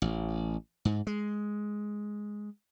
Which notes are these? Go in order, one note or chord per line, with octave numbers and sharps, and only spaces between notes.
A1
G#2
G#3